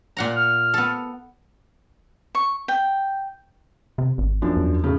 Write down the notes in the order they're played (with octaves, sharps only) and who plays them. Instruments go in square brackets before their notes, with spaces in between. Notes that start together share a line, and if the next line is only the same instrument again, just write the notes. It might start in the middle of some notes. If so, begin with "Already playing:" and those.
[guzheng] A#2 F#5 A#5
[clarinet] F6
[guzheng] B3 A4
[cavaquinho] C#6
G5
[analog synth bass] C3
G#1
[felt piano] F#2 F3 D4
[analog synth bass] E2
[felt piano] A2 C#3